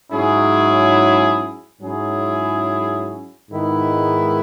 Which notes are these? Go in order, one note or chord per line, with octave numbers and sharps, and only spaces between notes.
G#2 F#3 C#4 E4 G#4
G#2 F#3 C#4 E4 G#4
G#2 D#3 G#3 B3 E4